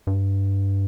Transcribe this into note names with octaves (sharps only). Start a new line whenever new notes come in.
G2